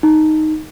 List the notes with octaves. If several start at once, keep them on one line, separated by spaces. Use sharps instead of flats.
D#4